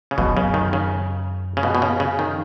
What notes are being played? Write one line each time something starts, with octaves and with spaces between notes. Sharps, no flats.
C#3
F#2 B2
C#3
D#3
C#3
C#3
B2
B2
C#3
C#3
D#3